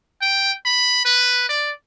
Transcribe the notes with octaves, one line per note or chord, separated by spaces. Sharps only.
G5
B5
B4
D5